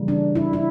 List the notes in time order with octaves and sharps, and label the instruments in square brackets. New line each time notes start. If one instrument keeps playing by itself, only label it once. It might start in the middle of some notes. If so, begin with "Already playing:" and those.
Already playing: [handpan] C#3 E3 G3 A#3
D4
E4
E4